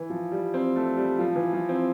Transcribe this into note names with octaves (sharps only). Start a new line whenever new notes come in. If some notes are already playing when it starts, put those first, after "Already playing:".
Already playing: E3
F3
G3
C4
A3
G3
F3
E3
F3
C4